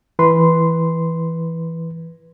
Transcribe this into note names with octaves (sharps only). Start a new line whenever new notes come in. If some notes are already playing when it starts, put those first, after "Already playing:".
E3 B4 C6